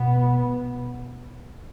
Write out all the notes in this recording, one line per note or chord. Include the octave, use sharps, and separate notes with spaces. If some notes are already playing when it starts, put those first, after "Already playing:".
Already playing: B2 B3